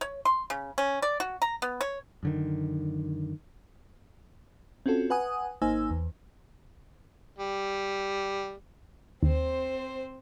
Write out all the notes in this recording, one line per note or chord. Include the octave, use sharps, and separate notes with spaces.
C#5
C6
C#3
C#4
D5
F#4
A#5
B3
C#5
F#2 D3 D#3
C4 C#4 F4 F#4 A4
B4 F#5 G#5 D#6
G#1 A#3 D#4 C5 G#5 E6
E2
G3
D#2 C4 C5